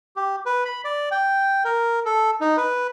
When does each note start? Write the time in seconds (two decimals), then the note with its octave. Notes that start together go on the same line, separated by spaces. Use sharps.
0.16 G4
0.46 B4
0.65 B5
0.84 D5
1.11 G5
1.65 A#4
2.05 A4
2.41 D#4
2.57 B4